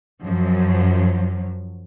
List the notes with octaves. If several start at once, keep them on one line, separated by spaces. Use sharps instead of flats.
F#2 F3 F#3